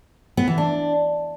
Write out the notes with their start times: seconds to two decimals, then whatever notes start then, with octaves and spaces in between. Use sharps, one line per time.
0.37 B3
0.48 E3
0.58 D4